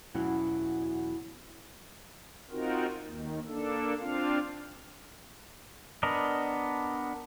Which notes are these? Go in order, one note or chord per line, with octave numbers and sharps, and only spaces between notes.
E2 B2 E3 F#3 C#4 F5
C4 D#4 F4 F#4 A#4
D#2 D#3
A#3 D4 A4
C4 D4 F4 F5
B3 D4 A#4 D#5